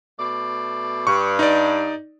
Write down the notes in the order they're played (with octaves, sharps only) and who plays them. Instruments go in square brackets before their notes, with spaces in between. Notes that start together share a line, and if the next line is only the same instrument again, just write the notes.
[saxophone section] B2 A3 D5
[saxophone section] G2 [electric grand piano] C#6
[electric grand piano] D#4 D5